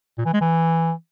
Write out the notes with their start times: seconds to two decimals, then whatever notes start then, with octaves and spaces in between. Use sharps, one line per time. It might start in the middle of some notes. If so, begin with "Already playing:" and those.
0.18 A#2
0.26 E3
0.34 G#3
0.41 E3